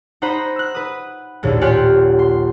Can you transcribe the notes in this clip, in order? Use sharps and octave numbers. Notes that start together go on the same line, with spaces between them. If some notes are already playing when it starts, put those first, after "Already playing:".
D#4 C5 F#5 A#5 B5 D#6
E6 F#6
B4 D#6
A#1 D#2 A2
F4 G4 C#5 F#5 G#5 C6
C6